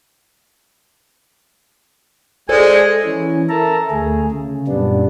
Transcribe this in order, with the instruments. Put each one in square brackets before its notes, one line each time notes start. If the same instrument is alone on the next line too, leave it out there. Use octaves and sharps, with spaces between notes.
[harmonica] G#3 [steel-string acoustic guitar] A4 C5 D5 [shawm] G#5
[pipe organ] E3 C#4
A4 A#4 E5 A5 A#5
D2 A3 G#4
C#3
F#2 A#2 G3 B3 D4